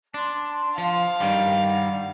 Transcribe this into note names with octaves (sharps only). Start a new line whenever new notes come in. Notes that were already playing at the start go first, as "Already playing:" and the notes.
D4 A5 C6
F3 F5
G2 D#3 G3
F#5